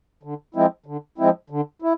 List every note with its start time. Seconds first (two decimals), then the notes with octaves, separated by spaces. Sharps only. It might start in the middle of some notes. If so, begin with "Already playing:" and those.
0.23 D3
0.54 F3 G#3 C4 E4
0.86 D3
1.18 F3 G#3 C4 E4
1.50 D3
1.82 E4